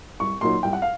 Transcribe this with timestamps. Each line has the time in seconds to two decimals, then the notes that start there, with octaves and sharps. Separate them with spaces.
0.20 C2 C#6
0.41 A#2 F#3 A#3 D#4 C6
0.63 C2 G5
0.73 F#5
0.82 F5